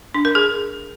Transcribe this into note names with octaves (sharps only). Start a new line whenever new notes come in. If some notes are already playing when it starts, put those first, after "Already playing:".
D4
A#4
G#4